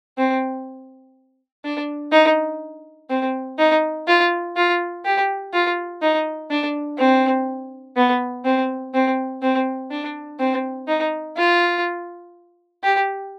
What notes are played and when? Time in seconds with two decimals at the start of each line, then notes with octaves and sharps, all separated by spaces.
0.18 C4
1.64 D4
2.12 D#4
3.10 C4
3.59 D#4
4.07 F4
4.56 F4
5.05 G4
5.53 F4
6.02 D#4
6.50 D4
6.99 C4
7.97 B3
8.45 C4
8.94 C4
9.42 C4
9.91 D4
10.40 C4
10.88 D#4
11.37 F4
12.83 G4